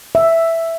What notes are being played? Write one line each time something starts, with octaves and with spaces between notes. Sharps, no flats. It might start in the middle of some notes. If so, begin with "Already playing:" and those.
E5